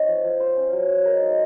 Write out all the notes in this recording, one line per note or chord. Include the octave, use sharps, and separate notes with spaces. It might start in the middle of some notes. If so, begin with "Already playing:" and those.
Already playing: G#3 C4 D#4 C#5 D#5
F3
F3
F4 C5
C#4
F#3
F#3
G#3 A#4
D#4